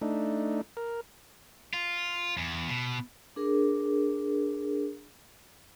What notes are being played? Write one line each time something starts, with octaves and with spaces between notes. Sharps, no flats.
A3 D4 D#4
A#4
F4
E2
B2
D4 G#4 A#4